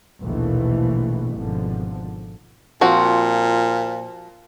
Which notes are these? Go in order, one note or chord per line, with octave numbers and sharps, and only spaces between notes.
A#1 D#2 B2 E3 A3
G#1 B2 D3 F3
A#2 F3 C4 F#4